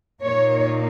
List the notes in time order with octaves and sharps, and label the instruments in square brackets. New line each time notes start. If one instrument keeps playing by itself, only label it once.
[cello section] A#2 A#3 D#4 C#5